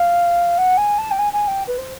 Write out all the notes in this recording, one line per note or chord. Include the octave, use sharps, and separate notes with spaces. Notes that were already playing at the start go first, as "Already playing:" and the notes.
Already playing: F5
F#5
G#5
A5
G5
G#5
G#5
G5
B4
C5